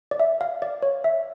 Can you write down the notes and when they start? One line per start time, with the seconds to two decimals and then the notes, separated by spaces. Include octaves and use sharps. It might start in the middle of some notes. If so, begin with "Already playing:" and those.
0.11 D5
0.20 E5
0.41 F5
0.62 D5
0.82 C#5
1.04 E5